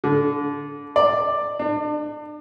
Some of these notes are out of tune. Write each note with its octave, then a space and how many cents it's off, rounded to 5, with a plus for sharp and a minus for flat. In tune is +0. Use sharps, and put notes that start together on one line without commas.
D3 -25
D5 +10
D4 +35